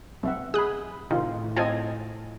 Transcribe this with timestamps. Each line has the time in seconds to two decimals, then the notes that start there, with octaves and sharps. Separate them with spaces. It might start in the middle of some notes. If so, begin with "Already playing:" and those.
0.23 B1 C4 E5 F#5
0.54 G#4 B5 D#6 F#6
1.11 A2 C3 D#3 F4
1.56 C4 F4 D#5 G#5 A5